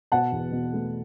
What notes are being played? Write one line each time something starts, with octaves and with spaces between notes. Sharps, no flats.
B2 F#5 A5
E2
B2
A3